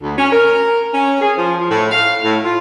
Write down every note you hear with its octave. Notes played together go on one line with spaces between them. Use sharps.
D2
C#4
A#4
C#4
G#4
F3
F3
A2
F5
A2
F4